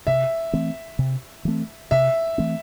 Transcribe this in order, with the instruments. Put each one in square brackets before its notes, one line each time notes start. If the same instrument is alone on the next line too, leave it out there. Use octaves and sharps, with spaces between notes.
[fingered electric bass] C3 [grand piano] E5
[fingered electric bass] E3 A3 C4
C3
E3 A3 C4
[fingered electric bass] C3 [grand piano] E5
[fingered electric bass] E3 A3 C4